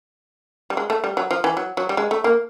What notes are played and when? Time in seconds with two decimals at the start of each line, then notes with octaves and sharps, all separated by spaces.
0.70 G3
0.77 G#3
0.90 A3
1.04 G3
1.17 F#3
1.31 F3
1.44 E3
1.57 F#3
1.77 F#3
1.89 G3
1.97 G#3
2.11 A3
2.24 A#3